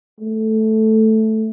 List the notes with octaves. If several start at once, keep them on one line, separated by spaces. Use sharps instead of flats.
A3